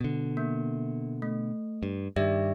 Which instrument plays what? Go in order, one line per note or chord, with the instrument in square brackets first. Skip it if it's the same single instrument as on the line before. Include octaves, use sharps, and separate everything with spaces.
[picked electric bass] B2 D3
[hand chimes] A#3
A3
[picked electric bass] G2
[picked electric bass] G2 D#3 [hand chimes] G4 D5 E5